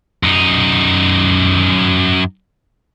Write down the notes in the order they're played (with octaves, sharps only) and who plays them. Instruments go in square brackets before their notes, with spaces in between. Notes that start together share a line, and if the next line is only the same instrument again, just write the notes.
[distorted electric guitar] F#2 D#4